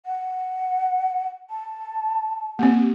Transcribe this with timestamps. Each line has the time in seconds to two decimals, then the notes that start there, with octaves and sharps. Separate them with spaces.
0.06 F#5
1.50 A5
2.59 A#3 C4 G4